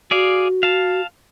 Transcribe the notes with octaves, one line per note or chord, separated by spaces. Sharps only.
F#4 G#4 D5 F5
F5 A5